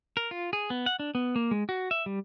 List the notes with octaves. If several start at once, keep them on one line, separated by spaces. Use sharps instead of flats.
A#4
F4
G#4
B3
F#5
D4
B3
A#3
G#3
F#4
E5
G3